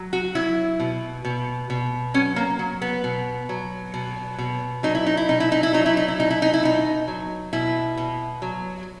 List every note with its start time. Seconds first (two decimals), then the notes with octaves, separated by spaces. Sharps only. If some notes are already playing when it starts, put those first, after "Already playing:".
Already playing: F#3
0.13 F#4
0.35 F#3 E4
0.80 B2
1.25 B2
1.70 B2
2.14 F#3 C#4
2.36 A#3
2.59 F#3
2.82 B3
3.04 B2
3.49 F#3
3.94 B2
4.38 B2
4.83 F#3 D#4
4.95 E4
5.06 D#4
5.17 E4
5.28 B2 D#4
5.40 E4
5.52 D#4
5.63 E4
5.73 F#3 D#4
5.86 E4
5.97 D#4
6.08 E4
6.18 B2 D#4
6.30 E4
6.42 D#4
6.54 E4
6.63 B2 D#4
7.08 F#3
7.53 B2 E4
7.97 B2
8.42 F#3